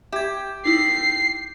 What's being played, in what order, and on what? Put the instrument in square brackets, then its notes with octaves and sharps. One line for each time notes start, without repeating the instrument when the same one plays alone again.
[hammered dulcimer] G4 [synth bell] E5 G#6
[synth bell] D#4 E4 [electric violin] C7